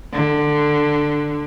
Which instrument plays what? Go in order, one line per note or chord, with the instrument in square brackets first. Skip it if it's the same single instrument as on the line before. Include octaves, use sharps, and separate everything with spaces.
[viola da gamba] D3